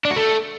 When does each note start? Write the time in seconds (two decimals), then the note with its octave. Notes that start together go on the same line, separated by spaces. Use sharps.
0.05 D4
0.11 F#4
0.16 A3